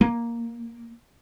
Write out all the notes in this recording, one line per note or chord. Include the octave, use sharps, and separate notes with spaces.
A#3